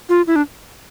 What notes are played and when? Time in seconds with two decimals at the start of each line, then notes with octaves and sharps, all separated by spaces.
0.09 F4
0.27 E4
0.36 D4